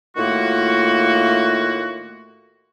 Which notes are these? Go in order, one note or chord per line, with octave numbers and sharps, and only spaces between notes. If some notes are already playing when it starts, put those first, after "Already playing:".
A2 D#3 A3 A#3 F4 F#4